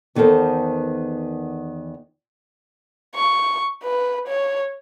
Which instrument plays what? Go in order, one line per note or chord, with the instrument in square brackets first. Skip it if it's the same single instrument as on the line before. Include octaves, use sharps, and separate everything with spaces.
[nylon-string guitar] E2 D#3 B3 A4 A#4 C5
[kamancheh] C#6
B4
C#5